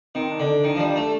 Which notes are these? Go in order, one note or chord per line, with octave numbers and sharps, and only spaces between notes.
D#3 C4
D4
D3
D4
D#3
F3
G3
A3